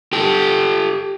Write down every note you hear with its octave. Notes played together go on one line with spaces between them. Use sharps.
G4 A4